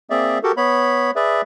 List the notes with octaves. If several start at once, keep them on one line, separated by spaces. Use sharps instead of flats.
A#3 C4 G#4 D5 E5
F#4 G4 A4 A#4
B3 C#5 B5
G#4 B4 D5 E5